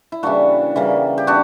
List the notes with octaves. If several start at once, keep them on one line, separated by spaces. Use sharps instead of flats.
E4
C#3 E3 G3 A#3 D4 F#4
C#3 E3 G3 A#3
G4
B3 D4 F#4